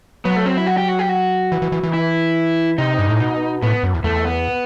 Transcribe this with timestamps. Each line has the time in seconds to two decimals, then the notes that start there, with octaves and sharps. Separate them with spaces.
0.25 F#3 B3
0.36 A3
0.46 C4
0.57 E4
0.67 F#4
0.77 G4
0.89 F#4
0.99 G4
1.09 F#4
1.52 E3
1.62 E3
1.72 E3
1.83 E3
1.93 E4
2.78 C3 D#4
2.99 G2
3.09 A2
3.20 B2
3.62 A2 B3
3.83 F#2
3.94 E2
4.04 E2 A3
4.25 B3